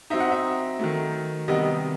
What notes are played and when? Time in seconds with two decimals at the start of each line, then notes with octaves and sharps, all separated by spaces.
0.10 F#3 C4 D#4 E5
0.20 F#5
0.31 E5
0.79 D#3 F#3 A3
1.48 C3 D#3 G3 B3 D#5